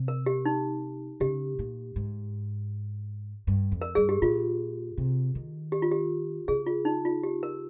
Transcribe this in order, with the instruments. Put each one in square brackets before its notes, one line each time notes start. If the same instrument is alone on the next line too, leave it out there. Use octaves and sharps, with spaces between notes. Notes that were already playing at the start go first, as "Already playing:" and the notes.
Already playing: [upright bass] C3
[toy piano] A#4
G4
D#4
[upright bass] C#3 [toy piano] G4
[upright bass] A#2
G#2
G2
F2
[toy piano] A#4
[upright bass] G2 [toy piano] G#4
[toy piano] G4
[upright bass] A#2 [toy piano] F4
[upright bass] C3
D#3
[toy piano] G4
F4
G4
[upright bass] C#3 [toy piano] G#4
[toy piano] F4
D#4
F4
G4
A#4